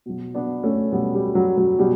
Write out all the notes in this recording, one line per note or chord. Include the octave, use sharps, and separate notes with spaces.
B2 F#3
B3 D4
A3 C#4
B2 F#3 G3 B3
G3
F#3
F#3
B2 F#3 G3